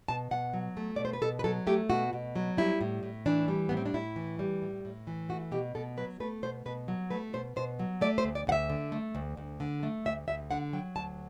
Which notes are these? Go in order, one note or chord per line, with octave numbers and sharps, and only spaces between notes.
B2 A5
B2 F#5
F#3
A3
B2 D5
C5
B4
B2 A4
B4
F#3 A4
A3 G4
B2 F#4
B2
F#3
G3 E4
A2
A2
E3 D4
G3
A2 B3
C4
D4
A2 E4
E3
G3
A2
A2
E3
A3 F#4
B2 G4
B2 A4
F#3 B4
A3 B4
B2 C5
B2 B4
F#3
A3 B4
B2 C5
B2 C5
F#3
A3 D5
C5
D2
D5
D2 F#5
E5
D3
A3
D2
D2
D3
A3
D2 E5
D2 E5
D3 F#5
F#3 G5
D2 A5